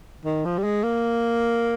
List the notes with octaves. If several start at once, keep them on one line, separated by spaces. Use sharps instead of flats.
D#3
F3
G3
G#3
A#3